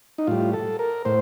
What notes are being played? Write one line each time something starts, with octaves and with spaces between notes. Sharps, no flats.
D#4
A2 G3 F4
A4
A#4
A2 C5